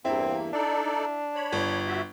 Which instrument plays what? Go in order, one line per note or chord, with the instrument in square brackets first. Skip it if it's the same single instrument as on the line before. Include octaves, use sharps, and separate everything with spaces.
[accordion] E2 G2 A#3 [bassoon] C4 [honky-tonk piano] E4
[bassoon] D4 [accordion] D#4 A4 D5
[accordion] C#5 B5
[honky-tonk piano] G1
[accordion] F#4 E5